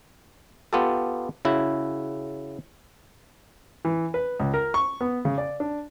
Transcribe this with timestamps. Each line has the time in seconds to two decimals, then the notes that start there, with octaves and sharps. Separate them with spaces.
0.73 B3 F4 G4 A4
1.45 C#3 E4 F#4
3.85 E3
4.14 B4
4.39 C#2
4.54 A#4
4.74 C#6
5.01 B3
5.25 C#3
5.38 D5
5.60 D4